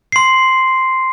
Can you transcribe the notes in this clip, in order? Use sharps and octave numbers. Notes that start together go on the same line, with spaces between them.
C6 C7